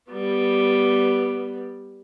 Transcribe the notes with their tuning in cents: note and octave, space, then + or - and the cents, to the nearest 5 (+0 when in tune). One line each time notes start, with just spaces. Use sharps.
G3 +0 B3 +0